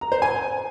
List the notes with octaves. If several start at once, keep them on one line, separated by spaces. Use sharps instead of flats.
A#5
C5
G#5